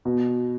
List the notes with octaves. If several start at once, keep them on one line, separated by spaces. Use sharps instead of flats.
B2